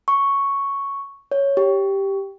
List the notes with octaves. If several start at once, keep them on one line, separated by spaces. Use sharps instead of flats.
C#6
C#5
G4